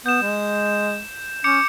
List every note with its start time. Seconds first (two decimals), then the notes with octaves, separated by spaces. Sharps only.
0.06 B3 G6 E7
0.22 G#3
1.44 C#4 D6 G6 C#7